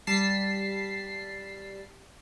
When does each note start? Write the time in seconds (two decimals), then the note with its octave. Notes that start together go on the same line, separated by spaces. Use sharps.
0.07 G3 A5 B6 C7